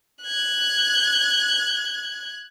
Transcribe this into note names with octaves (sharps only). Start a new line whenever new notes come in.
F#6 G#6